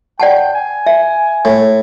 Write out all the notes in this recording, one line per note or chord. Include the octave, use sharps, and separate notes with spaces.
D5 F#5 G5 A5
G#5
E5
A2